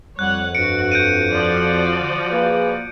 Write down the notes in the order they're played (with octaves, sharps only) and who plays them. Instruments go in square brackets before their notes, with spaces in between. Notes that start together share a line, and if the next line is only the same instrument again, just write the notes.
[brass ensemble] F2 [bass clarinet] G3 [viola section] C#5 F#5 [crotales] F#6
[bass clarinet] G2 [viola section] F#4 [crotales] C#7 D7
[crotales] G6 D7 D#7
[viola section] F3 F#4 D5
[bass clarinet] D3
[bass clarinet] A#3 [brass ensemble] G#4 B4 F5